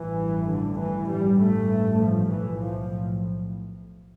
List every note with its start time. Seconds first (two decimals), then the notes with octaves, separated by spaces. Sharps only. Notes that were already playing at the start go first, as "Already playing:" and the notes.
Already playing: A1 G2 E3
0.49 D3
0.80 E3
1.10 A1 G2 G3
1.40 A3
2.00 F3
2.29 B1 A2 E3
2.59 F3